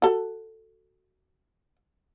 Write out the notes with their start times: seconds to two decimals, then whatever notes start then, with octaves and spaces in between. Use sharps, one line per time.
0.02 F#4 A4